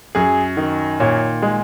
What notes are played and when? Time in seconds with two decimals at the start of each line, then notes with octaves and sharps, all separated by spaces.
0.15 F#2 G#4
0.57 D#3
1.00 A#2 C#5
1.42 G#3